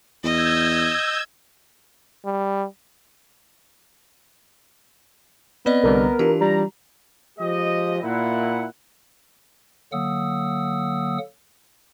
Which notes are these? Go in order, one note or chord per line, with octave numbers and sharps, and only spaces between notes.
E2 D#5 E6 G6 G#6
G3
B3 C4 D5 D#5
C2 D3 G3 A#4
E3 D4 F4 G4
G3 A#5
F3 G#3 G4 D#5
A#2 E4 F#5
D3 F#3 A#3 F#5 D#6 E6